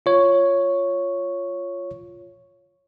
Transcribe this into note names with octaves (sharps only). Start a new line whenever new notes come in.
F4 C#5